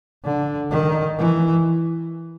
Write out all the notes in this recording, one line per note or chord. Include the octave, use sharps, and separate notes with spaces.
D3
D#3
E3